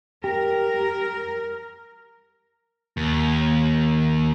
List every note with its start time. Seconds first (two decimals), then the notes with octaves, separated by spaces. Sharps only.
0.24 G4 A#4
2.97 D#2